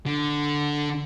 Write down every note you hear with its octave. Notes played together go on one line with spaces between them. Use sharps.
D3